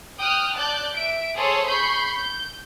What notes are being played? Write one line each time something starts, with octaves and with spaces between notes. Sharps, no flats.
G5 D#6 F6 F#6
D5 A5 F#6 G6
E5 D7
G#4 A4 C5 C#5 C6
B5 C#6 G6 C7
G6